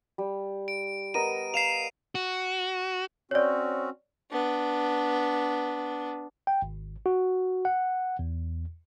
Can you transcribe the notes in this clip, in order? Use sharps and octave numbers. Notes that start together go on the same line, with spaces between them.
G3
D7
B3 A#4 D#5 D#7
F5 C7 E7 F7
F#4
C4 C#4 F#4 C#5 D5
B3 D4
G5
G#1
F#4
F#5
E2